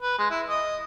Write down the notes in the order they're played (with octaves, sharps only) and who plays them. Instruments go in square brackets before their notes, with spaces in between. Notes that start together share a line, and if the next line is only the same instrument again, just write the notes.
[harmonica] B4
G#3
E4
D#5